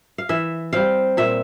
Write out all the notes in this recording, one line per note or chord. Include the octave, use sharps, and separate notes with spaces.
F5
E3 E5
G3 C4 F5
A#2 E5